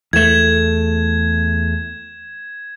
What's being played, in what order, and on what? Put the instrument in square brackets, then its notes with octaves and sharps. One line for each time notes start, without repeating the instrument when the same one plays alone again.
[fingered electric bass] E2 A3 [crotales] G#6 E7